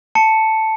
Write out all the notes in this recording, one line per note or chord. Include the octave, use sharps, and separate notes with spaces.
A5 C#7